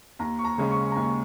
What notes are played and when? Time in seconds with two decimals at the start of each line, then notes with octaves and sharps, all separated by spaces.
0.19 D#2 A#5
0.39 C#6
0.45 A#5
0.58 C#3 G#3 C#4
0.71 C#6
0.92 A#5
0.96 D#2 G#5